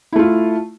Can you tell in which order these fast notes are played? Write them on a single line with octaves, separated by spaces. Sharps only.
E4 A3 F4